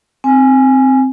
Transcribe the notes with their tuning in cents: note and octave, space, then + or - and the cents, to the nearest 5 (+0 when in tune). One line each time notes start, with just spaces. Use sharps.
C4 +0 G#5 +0